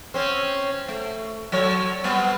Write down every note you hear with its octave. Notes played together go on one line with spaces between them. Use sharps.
C4 C#4
A3
F#3 A4 C#5
G3 B3 C4